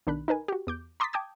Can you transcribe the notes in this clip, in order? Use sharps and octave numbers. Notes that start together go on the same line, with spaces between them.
B1 D#3 D4 B5 F#6
D#4 A#4 B4 G#5
F#4 G4
E2 D6 G6
A#5 C6 D6 D#6 A6 B6
G5 A5 D6 D#6 G6 G#6